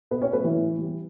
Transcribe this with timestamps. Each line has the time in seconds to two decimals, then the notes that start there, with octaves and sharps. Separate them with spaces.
0.11 B2 B3 B4
0.22 C#4 C#5
0.33 F#3 A3 B3 B4
0.44 E3 E4
0.56 A2
0.79 E3 G3 B3